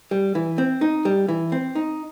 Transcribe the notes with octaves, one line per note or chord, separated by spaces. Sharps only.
G3
E3
C4
D#4
G3
E3
C4
D#4